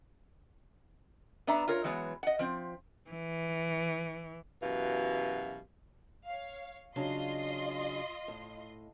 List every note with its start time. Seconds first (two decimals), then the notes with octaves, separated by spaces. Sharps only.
1.47 B3 D4 E5 A#5
1.68 F4 A#4 C#5
1.84 E3 F#3 G#3 B3
2.23 D#5 F#5
2.39 F3 C4
3.10 E3
4.63 F#2 B2 E3 G4 F5
6.24 C#5 F5
6.96 C#3 F#3 D4 F4 D#5 C6
8.28 A2